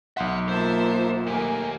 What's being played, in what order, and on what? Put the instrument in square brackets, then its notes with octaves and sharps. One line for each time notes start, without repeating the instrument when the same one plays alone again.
[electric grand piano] B1 F#5 [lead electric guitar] E5 C6
[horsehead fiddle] A#3 F4 [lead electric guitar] C5 [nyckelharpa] E5 A5
[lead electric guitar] D#2 G4 [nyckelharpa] A3 A#3 [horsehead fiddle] G#5